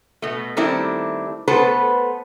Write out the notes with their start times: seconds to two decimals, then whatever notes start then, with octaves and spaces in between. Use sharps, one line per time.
0.22 B2 A3
0.57 D#3 G3 A3 C4 D4 E4
1.48 A3 B3 A4 B4 C5